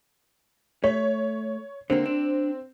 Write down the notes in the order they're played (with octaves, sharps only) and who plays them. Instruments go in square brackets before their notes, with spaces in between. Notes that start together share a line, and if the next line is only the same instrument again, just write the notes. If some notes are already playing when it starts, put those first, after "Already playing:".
[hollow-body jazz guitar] A3 [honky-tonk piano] C#5
[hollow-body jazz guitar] D3 A#3 [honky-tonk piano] C4
[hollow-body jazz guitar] D4